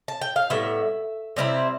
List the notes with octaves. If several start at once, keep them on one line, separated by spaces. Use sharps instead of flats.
A5
G5
F5
A2 G3 B3 E5
C3 G3 C4 E4